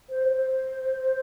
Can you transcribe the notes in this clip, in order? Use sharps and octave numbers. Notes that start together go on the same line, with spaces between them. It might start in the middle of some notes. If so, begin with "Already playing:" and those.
C5
C5